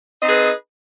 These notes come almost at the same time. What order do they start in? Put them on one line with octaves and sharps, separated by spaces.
D#5 C4 D#4 G#4 B4